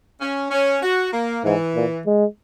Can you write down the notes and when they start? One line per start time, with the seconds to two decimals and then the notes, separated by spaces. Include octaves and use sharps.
0.21 C#4
0.51 C#4
0.83 F#4
1.13 A#3
1.45 G#2 E3
1.75 A#2
2.06 G#3